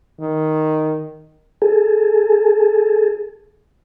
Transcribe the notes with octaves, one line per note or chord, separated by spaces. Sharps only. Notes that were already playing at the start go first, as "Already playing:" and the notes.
D#3
G#4 A4